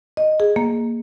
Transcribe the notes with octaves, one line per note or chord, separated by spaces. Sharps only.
D#5
G#4
A#3